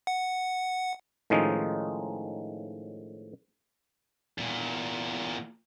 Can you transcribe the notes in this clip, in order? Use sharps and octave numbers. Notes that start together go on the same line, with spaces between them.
F#5
A2 D#3 F3 G#3 C#4 D#4
E2 A#2